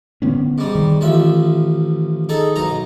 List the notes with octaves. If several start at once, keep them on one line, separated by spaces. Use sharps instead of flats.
D3 B3 C#4
G#2 G3
D#3
A1 F3 E5
D#4 G#4 A4
B1 D#4 A#5